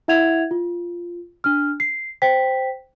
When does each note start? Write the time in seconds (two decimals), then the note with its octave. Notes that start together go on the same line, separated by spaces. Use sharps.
0.08 E4 E5 F#5 G#6 F7
0.51 F4
1.44 D4 F6
1.80 C7
2.22 C5 G5 B6